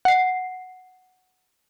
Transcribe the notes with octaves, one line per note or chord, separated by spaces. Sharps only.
F#5 C7